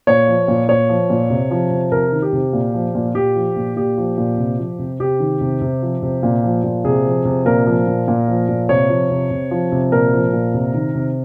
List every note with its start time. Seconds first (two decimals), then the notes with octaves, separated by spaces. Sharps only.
0.07 A#2 C#5
0.27 F3
0.48 A#2
0.68 A#2 C#5
0.89 F3
1.10 A#2
1.30 C3
1.51 F3
1.71 C3
1.92 C3 A#4
2.12 D#3
2.22 G4
2.33 C3
2.53 A#2
2.74 F3
2.95 A#2
3.15 A#2 G4
3.35 F3
3.56 A#2
3.76 A#2 G4
3.97 F3
4.17 A#2
4.38 C3
4.59 F3
4.79 C3
5.00 C3 G4
5.20 D#3
5.41 C3
5.61 C3
5.82 F3
6.02 C3
6.23 A#2
6.43 F3
6.64 A#2
6.84 C3 G#4
7.05 F3
7.25 C3
7.46 A#2 A#4
7.66 F3
7.87 A#2
8.08 A#2
8.28 F3
8.49 A#2
8.69 C3 C#5
8.90 F3
9.11 C3
9.31 C3
9.51 F3
9.72 C3
9.92 A#2 A#4
10.13 F3
10.33 A#2
10.54 C3
10.74 D#3
10.95 C3